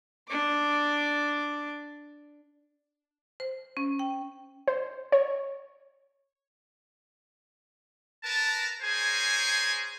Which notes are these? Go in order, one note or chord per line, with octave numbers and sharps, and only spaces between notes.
D4 D6
C5
C#4
G5
C5
C#5
A#4 B4 A5
G#4 A#4 C5 C#5 G#5